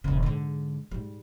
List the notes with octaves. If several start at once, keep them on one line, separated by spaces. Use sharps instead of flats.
D#1 C#3
G#2 D3
G#2 G3